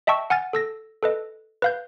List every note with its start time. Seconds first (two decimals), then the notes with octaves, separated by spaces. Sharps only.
0.07 D#5 E5 G5 A5 C#6 E6
0.30 F#5 G#5 F6 A6
0.53 A4 E6 A#6
1.03 A4 B4 D#5
1.62 B4 F5 G6